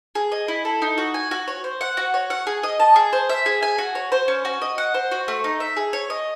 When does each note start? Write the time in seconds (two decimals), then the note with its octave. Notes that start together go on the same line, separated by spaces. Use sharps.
0.15 G#4
0.32 D#5
0.48 E4
0.65 A4
0.82 D#4
0.98 F#4
1.14 G#5
1.31 F#4
1.48 C#5
1.64 C5
1.81 F#5
1.97 F#4
2.14 C#5
2.30 F#5
2.47 G#4
2.63 D#5
2.80 A5
2.96 G#4
3.13 C5
3.29 E5
3.46 G#4
3.62 G#5
3.78 F#4
3.95 C#5
4.12 C5
4.28 C#4
4.45 F#4
4.62 D#5
4.78 F#5
4.94 C5
5.11 F#4
5.28 A3
5.44 D#4
5.60 E5
5.77 G#4
5.93 C#5
6.10 D#5